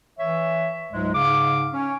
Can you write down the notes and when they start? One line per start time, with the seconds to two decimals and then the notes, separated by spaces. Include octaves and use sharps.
0.18 E3 C#5 E5
0.92 C#2 G#2 F#3 G#3
1.13 G#2 C#3 F5 D6
1.72 C#4